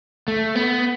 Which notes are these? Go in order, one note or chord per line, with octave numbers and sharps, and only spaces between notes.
A3
B3